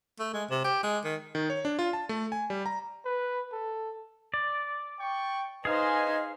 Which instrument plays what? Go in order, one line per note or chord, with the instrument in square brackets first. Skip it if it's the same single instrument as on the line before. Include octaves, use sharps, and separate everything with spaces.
[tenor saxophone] A3
G#3
C3
G4
G#3
D#3
[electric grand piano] D#3
C#5
D4
F4
A5
A3
G#5
G3
A#5
[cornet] B4
A4
[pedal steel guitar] D5
[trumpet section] G5 C#6
[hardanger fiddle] D#4 C5 [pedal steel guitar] G#4 F5 [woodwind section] B4 D#5 [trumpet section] G#5